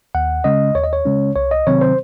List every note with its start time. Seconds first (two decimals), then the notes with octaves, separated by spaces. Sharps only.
0.15 D#2 F#5
0.44 C#3 G#3 C#4 D#5
0.75 D#2 C#5
0.84 D#5
0.93 C#5
1.05 C#3 G#3 C#4
1.36 C2 C#5
1.51 D#5
1.67 C3 D#3 F#3 C4 C#5
1.81 C5